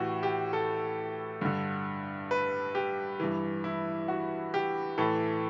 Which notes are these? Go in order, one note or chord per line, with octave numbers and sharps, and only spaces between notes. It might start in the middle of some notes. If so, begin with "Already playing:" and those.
Already playing: A2 E3 F#4 G4
G4
A4
G2 D3
B4
G4
G2 E3
E4
F#4
G4
A2 E3 A4